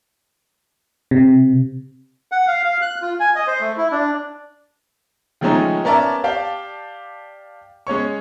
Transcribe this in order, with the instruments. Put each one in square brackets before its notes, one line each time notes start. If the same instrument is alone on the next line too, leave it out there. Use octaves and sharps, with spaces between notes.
[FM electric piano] C3
[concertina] F#5
F5
F5
F#6
F4
G#5
D#5
C5
A3
E4
D4
[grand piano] D#3 F3 G#3 A3 C#4 D#4
B3 C#4 A#4 D5 E5 A5
G4 D5 F5 G5 A5
G#3 C#4 C#5 C#6